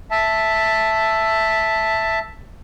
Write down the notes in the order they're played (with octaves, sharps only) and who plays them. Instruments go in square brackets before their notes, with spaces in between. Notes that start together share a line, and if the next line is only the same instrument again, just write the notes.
[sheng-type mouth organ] E5 A5